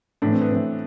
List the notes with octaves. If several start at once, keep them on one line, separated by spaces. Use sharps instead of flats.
A2 E3 D4
C4
B3
A2 E3 C4